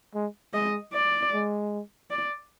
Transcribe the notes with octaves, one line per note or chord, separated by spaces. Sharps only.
G#3
G#3 D#5
D5
G#3
D5